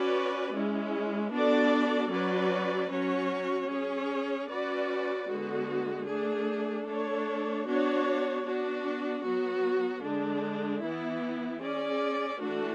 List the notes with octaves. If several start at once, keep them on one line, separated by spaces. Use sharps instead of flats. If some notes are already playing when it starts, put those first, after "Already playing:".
Already playing: C#4 F#4 B4 D5
G#3 C#4 E4
B3 D4 F#4 A4 D5
F#3 C#4 F#4 B4 D5
F#3 C#4 F#4 C#5
C#4 G#4 C#5
C#4 F#4 B4 D5
D3 G#3 B3 F#4
A3 D4 G#4
A3 D4 A4 C#5
B3 D4 F#4 C#5
B3 D4 F#4
F#3 B3 F#4
D3 G#3 D4
E3 B3 E4
C#4 G#4 D5
E3 A3 D4 F#4